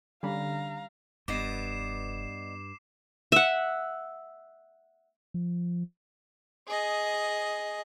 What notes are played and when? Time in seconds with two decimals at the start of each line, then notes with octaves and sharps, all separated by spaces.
0.23 D3 G3 C#4 F5 A#5 B5
1.28 F1 G2 B3 D5 D#5 D6 C7 E7
3.32 E5 F#5
5.34 F3
6.68 G#4 D#5